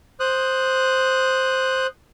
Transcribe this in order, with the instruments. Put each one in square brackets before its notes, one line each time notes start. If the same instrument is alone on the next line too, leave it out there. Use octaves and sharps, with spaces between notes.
[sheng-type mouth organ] C5 D#6 F#6